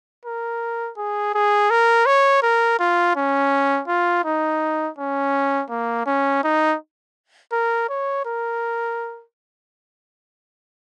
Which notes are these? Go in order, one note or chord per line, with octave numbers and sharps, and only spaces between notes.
A#4
G#4
G#4
A#4
C#5
A#4
F4
C#4
F4
D#4
C#4
A#3
C#4
D#4
A#4
C#5
A#4